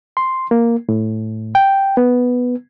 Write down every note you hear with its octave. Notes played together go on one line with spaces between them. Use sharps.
C6
A#3
A2
G5
B3